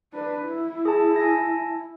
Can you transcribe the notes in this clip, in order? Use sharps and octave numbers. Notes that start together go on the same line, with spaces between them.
D4 B4
E4
G#4 A5
G#5 A5 A#6